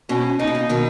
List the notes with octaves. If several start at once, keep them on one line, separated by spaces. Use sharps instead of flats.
B2 C#4
C#3 D#4
B2
C#3
B2 D#3